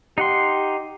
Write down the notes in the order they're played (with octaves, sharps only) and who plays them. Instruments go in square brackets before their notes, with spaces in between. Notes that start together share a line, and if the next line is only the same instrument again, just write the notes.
[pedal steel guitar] D#4 F#5 C6 [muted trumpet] G4